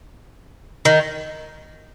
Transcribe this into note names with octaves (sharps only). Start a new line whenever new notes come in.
D#3